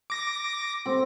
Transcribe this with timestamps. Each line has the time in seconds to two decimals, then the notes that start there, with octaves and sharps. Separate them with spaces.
0.10 D6 A#6
0.86 C4